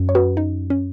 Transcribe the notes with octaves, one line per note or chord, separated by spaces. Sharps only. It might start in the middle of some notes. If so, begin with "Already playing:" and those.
Already playing: F#2
C#5
F#4 B4
D#4
C#4